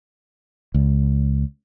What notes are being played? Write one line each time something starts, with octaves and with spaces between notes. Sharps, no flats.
C#2